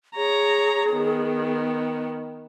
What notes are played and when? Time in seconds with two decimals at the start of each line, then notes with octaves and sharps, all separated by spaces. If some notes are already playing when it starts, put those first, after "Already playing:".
0.16 G#4 C#5 A#5
0.91 D#3 B3